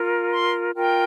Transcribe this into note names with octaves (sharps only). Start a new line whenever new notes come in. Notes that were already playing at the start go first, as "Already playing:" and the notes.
Already playing: F4 A#4
C6
F4 A#4 G5